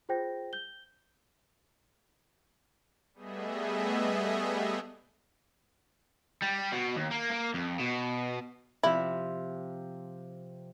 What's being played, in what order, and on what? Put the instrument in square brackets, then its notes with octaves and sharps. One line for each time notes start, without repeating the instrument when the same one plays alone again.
[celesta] F4 G#4 C5 G5 G6 A#6
G6 G7
[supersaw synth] G3 A3 B3 G#4 D#5 E5
[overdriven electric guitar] G3
B2
D#2
A#3
A#3
F2
B2
[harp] C3 F3 E5 [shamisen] E4